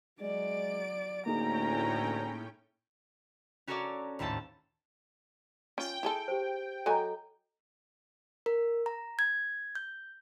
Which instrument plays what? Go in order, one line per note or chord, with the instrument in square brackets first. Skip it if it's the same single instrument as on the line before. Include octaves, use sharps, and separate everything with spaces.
[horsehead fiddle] F#3 D5 [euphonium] G#3 [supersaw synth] D7
[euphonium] D2 [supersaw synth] A2 C#4 G5 [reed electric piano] A#3 D#4 G#4 [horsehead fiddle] A#5
[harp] C#4 F#4 A4 A#4 C#5 D5
G#1 D#2 A2 A4 A5
[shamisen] C#4 F4 [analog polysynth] G5
[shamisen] E4 G#4 A4
[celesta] G4 C5
[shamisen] F#3 G#5 [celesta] A4 D#5 A#5
[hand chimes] A#4
A#5
G#6
G6